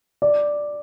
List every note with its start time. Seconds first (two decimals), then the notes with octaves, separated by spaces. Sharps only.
0.22 D5